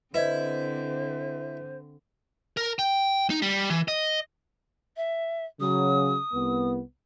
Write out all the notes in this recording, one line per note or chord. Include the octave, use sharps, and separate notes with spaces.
D3 C4 E4 B4 C5 D#5 G#6
A#4
G5
D#4
G3
E3
D#5
E5
C#3 F#3 D#6
C2 B3